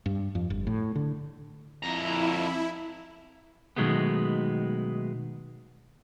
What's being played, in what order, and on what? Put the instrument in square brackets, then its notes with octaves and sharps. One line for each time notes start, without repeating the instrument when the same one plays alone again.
[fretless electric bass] G2
F2
G1
A2
D3
[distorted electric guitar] F2 A#5 [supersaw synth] E4
[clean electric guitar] B2 D#3 F#3 G#3 A3 B3